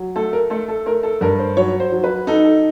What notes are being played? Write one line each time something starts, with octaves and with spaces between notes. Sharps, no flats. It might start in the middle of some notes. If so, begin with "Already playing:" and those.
Already playing: F#3
A3 A4
A#4
A3 A4
A4
A3 A#4
A4
G2 A#4
C5
F#3 C#5
C5
F#3
B4
D#4 A4
A4